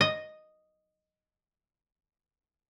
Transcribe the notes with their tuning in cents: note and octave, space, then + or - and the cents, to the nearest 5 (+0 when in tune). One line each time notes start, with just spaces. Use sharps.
D#5 -5